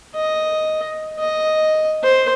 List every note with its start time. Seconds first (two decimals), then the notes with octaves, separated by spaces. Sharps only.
0.15 D#5
1.19 D#5
2.03 C5